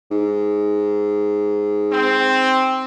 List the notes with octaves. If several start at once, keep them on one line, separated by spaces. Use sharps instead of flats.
G#2
C4